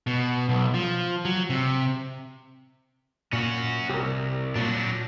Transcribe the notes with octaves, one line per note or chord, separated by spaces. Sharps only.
B2
B1
F3
F#3
C3
A#2 C#4 F#4
C2 G4 A#4
A#2 F#3 D4